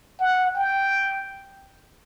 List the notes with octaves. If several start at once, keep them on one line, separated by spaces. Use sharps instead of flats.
F#5
G5